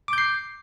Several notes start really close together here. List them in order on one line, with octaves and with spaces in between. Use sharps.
D6 G6 C7